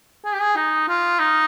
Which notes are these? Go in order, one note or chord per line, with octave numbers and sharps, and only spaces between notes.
G#4
G4
G#4
D#4
F4
D#4